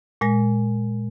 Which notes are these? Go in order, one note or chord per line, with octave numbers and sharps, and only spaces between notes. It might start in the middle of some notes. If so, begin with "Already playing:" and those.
A#2 G#3 A#6